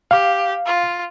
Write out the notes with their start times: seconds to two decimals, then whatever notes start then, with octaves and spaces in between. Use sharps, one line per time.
0.11 G4 F5
0.66 F4